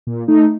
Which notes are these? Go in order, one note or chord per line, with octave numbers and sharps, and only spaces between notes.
A#2
A3 D#4